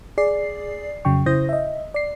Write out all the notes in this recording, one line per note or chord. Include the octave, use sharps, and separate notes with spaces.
G#4 D5 C7
F2 C#3 F#3 G5 C#6
C#3 E4 C5 D#6 G6 A#6
D#5 E5
D5 C7